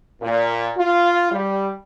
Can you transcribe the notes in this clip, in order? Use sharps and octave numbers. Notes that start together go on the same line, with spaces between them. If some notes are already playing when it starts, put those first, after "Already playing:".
A#2
F4
G3